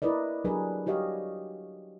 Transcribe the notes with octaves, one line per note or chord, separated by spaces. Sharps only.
E4 A#4 B4 D5 D#5
F#3 D4 G4 G#4 A#4 B4
F#4 G4 C#5 D#5 F5